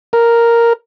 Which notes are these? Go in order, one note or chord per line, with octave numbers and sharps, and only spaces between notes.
A#4